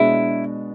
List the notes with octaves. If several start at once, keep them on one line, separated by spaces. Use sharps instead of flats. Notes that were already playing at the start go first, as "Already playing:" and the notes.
Already playing: B2 G#3 D4 E4